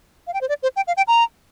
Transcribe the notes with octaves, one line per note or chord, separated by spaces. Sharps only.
F5
G5
C5
D5
C5
G5
F5
G5
A#5